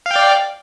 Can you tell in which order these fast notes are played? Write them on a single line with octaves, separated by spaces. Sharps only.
F5 G5 D5